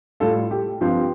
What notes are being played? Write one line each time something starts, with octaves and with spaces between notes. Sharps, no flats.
A2 G3 F4 A4
G4
G2 F3 C4 F4 G4